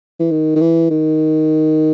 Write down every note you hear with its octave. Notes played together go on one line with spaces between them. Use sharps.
E3
D#3
D#3
E3
D#3